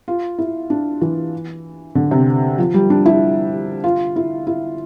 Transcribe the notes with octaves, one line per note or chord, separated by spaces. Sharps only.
F4
E4
D4
E3
D3
C3
F3
G3
D4
E4
F4
E4
E4